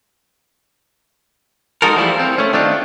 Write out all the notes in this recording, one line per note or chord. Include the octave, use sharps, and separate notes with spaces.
G#3 D#4 F#4 A4 A#4
E3 F3 G3 A3 E4 F4
C4
A3 C#4
D#3 A3 C4 D4 F4